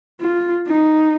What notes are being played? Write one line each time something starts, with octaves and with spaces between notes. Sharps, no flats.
F4
D#4